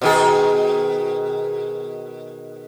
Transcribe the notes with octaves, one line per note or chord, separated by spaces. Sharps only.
B2 D#3 G#4